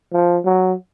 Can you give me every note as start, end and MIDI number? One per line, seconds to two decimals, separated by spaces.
0.13 0.38 53
0.45 0.74 54